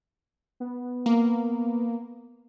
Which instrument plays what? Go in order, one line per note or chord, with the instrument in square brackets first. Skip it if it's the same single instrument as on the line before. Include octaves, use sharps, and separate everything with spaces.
[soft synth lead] B3
[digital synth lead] A#3